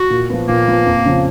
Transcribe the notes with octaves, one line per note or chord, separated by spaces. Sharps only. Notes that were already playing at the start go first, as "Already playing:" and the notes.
Already playing: F#4
A#2
F3 B3
A#2 A#3
F3 B3
F2
C#3 F3